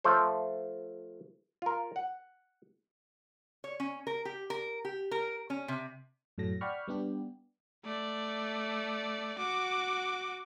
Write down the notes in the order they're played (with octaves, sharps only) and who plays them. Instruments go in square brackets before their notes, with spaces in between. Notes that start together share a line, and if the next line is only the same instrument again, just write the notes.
[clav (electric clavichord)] F3 A3 A4 C5
F4 A#4
F#5
[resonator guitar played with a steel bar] C#5
C#4
A#4
G4
A#4
G4
A#4
C#4
C3
[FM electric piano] F#2 A2 F#3 A4 A#6
D5 F#5 G5 B5 C#6 F6
G3 B3 D4 G4
[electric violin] A3 D5
F#4 D6